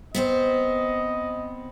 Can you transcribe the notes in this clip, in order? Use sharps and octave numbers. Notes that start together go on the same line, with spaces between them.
B3 C4 C5 D#5